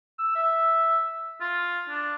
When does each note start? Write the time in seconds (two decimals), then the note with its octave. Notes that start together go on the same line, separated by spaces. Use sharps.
0.19 E6
0.35 E5
1.41 F4
1.89 D4